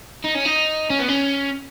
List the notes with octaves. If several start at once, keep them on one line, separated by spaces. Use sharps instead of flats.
D#4
C#4
D#4
C#4
B3
C#4